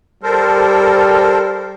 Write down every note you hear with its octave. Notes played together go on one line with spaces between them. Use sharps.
G3 A4 A#4 C5